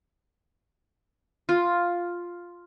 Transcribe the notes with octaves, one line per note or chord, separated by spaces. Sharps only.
F4